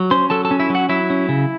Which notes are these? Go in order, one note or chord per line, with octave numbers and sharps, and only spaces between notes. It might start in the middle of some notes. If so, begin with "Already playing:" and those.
Already playing: F#3
C#4 C5 C6
F#3 A4 A5
A4 A5
C#4
E4 E5
F#3
F#4 F#5
F#3 E4 E5
C#4
C#3